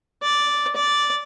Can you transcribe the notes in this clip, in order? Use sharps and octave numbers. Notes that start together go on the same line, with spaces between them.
D5
D5